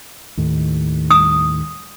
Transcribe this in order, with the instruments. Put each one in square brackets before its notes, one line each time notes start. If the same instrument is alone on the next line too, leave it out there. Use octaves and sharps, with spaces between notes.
[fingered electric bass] D#2 A2 D#3
[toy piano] D#6